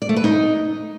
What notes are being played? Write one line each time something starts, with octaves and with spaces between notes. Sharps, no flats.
D5
A3
B4
D#4